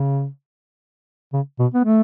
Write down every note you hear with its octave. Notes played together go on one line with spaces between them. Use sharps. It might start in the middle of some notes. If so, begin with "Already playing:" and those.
Already playing: C#3
C#3
B2
B3
A3